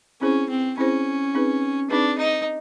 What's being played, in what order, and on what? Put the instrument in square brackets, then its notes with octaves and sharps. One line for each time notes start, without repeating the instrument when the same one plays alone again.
[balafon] C4 E4 G#4 C5 [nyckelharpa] C#4
[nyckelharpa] C4
[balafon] C4 E4 G#4 C5 [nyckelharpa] C#4
[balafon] C4 D#4 G#4 B4
[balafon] C4 D#4 G#4 B4 [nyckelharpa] D4
[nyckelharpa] D#4